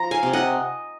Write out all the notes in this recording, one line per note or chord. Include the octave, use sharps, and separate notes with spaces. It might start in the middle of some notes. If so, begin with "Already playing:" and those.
Already playing: F3 A#5 C6
F5 G#5
C3
D#5 F#5